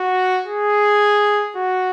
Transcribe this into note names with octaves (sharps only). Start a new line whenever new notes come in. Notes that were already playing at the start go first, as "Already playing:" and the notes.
Already playing: F#4
G#4
F#4